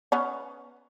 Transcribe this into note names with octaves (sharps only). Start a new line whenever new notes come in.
B3 C#4 F#5